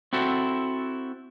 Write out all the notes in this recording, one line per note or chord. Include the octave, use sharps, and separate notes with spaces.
C4 E4 F#4 A4